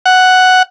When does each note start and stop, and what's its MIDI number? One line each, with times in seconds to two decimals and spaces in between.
0.06 0.63 78